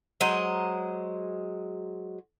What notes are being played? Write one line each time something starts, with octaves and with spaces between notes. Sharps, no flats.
F#3 G#3 C5 D#5